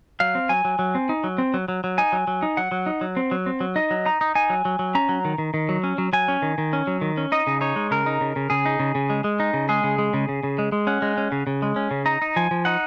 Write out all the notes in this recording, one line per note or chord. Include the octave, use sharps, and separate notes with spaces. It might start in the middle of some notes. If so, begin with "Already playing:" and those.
F#3 F5
C4
F#3 G#5
F#3
F#3
C4
D#4
F#3
C4
F#3
F#3
F#3
D#4 G#5
F#3
F#3
D#4
F#3 F#5
F#3
D#4
F#3
C4
F#3
C4
F#3
D#4 D#5
F#3
D#4 A#5
D#4
D#4 G#5
F#3
F#3
F#3
C#4 A#5
F#3
D#3
D#3
D#3
F#3
C#4
F#3
F#3 G#5
C#4
D#3
D#3
C#4
F#3
D#3
C#4
D#4 D#5
C#3
D#4 C#5
G#3
C#3 A#4
D#4
C#3
C#3
C#3 G#4
D#4
C#3
C#3
G#3
G#3
D#4
C#3
G#3 G#4
C#3
G#3
C#3
C#3
C#3
G#3
G#3
C#4 F#5
G#3
C#4
C#3
C#3
G#3
C#4
C#3
D#4 A#5
D#4
F3 G#5
F3
D#4 F#5